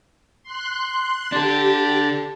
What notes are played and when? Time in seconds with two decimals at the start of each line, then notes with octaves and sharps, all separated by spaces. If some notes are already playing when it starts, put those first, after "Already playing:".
0.43 C6 F#6
1.32 D4 G4 A4